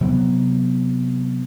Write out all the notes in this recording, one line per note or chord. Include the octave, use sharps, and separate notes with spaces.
C3 F#3 B3